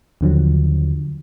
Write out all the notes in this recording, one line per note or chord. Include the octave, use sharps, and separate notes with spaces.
D#2 D3 F3 F#3